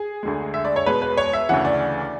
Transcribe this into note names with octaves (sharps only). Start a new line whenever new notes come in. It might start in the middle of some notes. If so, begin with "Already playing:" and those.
Already playing: G#4
D2 D3 G#3
E5
D5
C#5
E2 B2 G#3 B4
B4
C#5
E5
D2 C#3 E3 F#5
D5